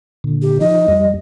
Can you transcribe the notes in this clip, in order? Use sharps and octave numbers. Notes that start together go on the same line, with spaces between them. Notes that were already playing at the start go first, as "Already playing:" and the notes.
A#2 D3
G4
F3 D#4 D#5
F2 G3